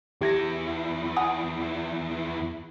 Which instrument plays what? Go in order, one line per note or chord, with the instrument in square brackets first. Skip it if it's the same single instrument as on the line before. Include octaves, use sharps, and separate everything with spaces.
[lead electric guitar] E2 E4 [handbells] G4 G#6 A#6
[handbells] F#5 G#5 D#6